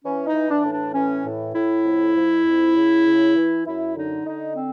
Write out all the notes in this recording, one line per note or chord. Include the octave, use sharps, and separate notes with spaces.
E3 C#4
D#4
E3
D4
A2
D4
E3 C#4
A2
A2 E4
F2
F2
F2
C#3
C#3
E3
F#2 E4
D3 D#4
D3 D#4
C4